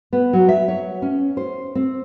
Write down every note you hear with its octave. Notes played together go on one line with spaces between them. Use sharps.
B3
F#3
E5
C#5
C#4
C5
C4